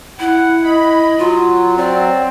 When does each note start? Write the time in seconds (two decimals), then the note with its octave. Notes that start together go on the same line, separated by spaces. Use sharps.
0.20 E4 F#5
0.64 D#5 B5
1.18 F#3 F4
1.78 C4 D5